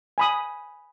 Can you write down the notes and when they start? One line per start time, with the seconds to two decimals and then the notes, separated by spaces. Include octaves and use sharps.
0.18 G#5 B5 D#6